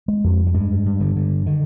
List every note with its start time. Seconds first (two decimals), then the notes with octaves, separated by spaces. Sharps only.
0.08 G#3
0.24 F2
0.47 G3
0.54 G2 G#3
0.86 G2
1.00 D3
1.16 D3
1.46 D3 D#3